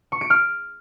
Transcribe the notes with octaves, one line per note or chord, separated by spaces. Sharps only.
C#6
D7
F6